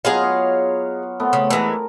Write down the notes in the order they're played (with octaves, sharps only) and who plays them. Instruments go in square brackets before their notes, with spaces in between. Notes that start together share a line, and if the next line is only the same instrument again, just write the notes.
[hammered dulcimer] F#3 B3 F4 [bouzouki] G#4 D#5 F5
[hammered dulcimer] C#5
A3 B3 C4
[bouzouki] C#3
[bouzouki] E3 G#3 [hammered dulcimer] A#4 A5